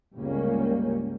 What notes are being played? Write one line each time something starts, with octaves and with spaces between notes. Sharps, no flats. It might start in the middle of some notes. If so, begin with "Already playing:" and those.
G1 C#2 C#3 G3 A#3 C#4